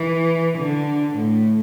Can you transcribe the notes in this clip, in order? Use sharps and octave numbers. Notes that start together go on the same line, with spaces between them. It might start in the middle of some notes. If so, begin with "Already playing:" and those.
Already playing: E3
D3
A2